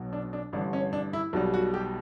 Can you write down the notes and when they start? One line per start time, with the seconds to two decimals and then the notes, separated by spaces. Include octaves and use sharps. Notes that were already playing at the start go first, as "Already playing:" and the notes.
Already playing: B1 B2 F#3
0.13 D4
0.33 D4
0.53 A1 G2 D3 D4
0.73 C#4
0.93 D4
1.13 E4
1.33 B1 B2 G3
1.54 F#4
1.74 G4